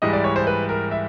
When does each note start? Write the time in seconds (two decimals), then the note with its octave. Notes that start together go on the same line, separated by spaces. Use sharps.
0.02 G#2 E3 G3 D#5
0.13 D5
0.24 C#5
0.36 C5
0.47 B4
0.69 A#4
0.91 E5